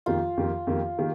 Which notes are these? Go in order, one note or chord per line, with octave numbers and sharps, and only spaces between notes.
F2 D#3 A#3 F4 G4
F2 D#3 A#3 G4
F2 D#3 A#3 G4
D#3 A#3 G4